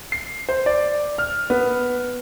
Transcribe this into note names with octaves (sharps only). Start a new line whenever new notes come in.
C7
C5
D5
F6
B3